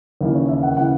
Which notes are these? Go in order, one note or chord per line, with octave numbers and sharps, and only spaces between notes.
D#2 C#3 E3
C#5
E5
F#5
C#3 E3 F#5